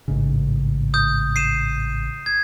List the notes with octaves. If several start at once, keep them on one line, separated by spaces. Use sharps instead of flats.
A1 G#2 C#3
D#6 G6
C7 D#7 E7
G#6